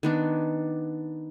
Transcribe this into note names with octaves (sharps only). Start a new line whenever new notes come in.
D#3 B3 D4